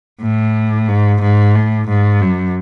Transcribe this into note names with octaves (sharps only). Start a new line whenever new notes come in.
A2
G#2
G#2
A2
G#2
F#2